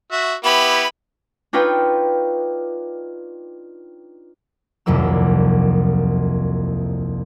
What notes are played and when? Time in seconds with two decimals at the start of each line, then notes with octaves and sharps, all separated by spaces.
0.12 F#4 E5
0.44 B3 E4 G4 B5
1.53 D4 D#4 F4 B4 C#5 G5
4.86 D#1 C2 F2 F#3 A#3 E6